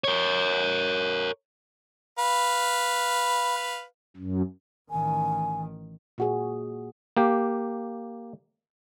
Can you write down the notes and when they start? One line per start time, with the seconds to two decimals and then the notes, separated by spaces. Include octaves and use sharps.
0.04 A#4 C#5
2.19 B4 F5
4.17 F#2
4.91 A1 D#3 G#5
6.18 A#2 F#4 G#4
7.17 A#3 G4